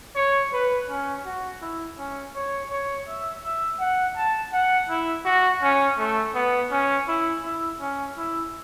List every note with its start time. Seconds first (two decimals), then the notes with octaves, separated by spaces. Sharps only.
0.16 C#5
0.53 B4
0.89 C#4
1.25 F#4
1.61 E4
1.98 C#4
2.35 C#5
2.71 C#5
3.07 E5
3.44 E5
3.80 F#5
4.16 A5
4.53 F#5
4.89 E4
5.25 F#4
5.62 C#4
5.98 A3
6.35 B3
6.71 C#4
7.08 E4
7.44 E4
7.81 C#4
8.17 E4